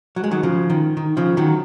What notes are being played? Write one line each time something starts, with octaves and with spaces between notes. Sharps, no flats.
F#3
G#3
D#3 F#3
C#3 F3
D#3
D#3
C#3 F3
D#3 F#3